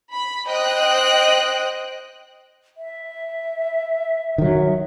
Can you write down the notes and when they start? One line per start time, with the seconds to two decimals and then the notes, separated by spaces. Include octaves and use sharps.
0.12 B5
0.47 C5 D#5 G5 F#6
2.77 E5
4.38 D#3 F#3